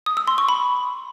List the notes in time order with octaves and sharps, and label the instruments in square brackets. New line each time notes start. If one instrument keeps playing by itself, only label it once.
[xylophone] D#6
E6
C6
C#6
B5